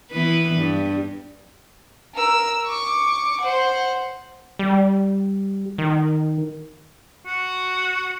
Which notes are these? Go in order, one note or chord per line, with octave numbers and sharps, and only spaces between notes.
E3 B3 B4
G2
A#4 E6
C#6 D6
C5 F#5
G3
D#3
F#4